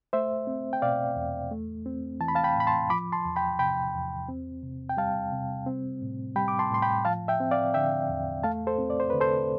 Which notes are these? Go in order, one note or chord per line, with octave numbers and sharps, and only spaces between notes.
A3 C5 E5
C4
G5
B2 D5 F5
E2
A3
C4
E3 A5
B5
F5 A5
G5 B5
A2 B5
A5 C6
F3 B5 D6
A5 C6
E2
G5 B5
C3 G5 B5
E2
C4
C3
G5
G3 F5 A5
C3
C4
A2
G3 G5 B5
D6
A5 C6
A2 C6
G5 B5
F3 F5 A5
E5 G5
C4
D5 F5
D3 E5 G5
E2
A3 F5 A5
A4 C5
C4
D5
C5
D3 B4
A4 C5